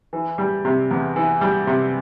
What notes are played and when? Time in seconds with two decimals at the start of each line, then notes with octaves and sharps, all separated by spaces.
0.13 E3
0.38 G3
0.65 C3
0.91 E2
1.16 E3
1.41 G3
1.67 C3